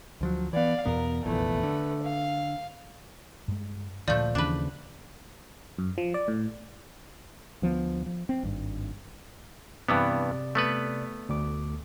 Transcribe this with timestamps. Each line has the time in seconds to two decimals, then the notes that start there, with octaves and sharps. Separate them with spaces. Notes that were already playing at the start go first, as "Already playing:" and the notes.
0.21 D2 F3 F#3
0.53 E3 B3 D5 F5
0.86 E2 B2 B3 A#4
1.26 F1 A#1 E2 A3 B4
1.63 D3
2.03 F5
3.48 G2 G#3
4.08 D2 A#2 F3 A3 D5 G6
4.35 D#2 C#3 E3 D4 B4
5.78 F#2
5.98 F3
6.14 D5
6.28 A2
7.62 D2 F3 A3 B3
8.06 F3
8.29 C4
8.43 G#1 G2
9.88 G2 C3 E3 B3 D5
10.55 A3 B3 B4
11.29 D2 D6